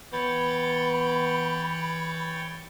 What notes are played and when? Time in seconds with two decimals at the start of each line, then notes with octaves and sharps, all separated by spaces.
0.12 E3 B3 C#5 G5 B5 A6